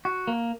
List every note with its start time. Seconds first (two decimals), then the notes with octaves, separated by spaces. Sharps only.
0.05 F#4
0.27 A#3